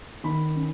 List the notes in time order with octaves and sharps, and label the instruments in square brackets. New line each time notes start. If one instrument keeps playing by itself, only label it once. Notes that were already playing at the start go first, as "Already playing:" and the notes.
[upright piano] D#3 B5
C#4